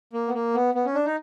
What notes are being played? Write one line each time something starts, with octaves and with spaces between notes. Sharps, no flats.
A#3
B3
A#3
B3
B3
C#4
D4
D#4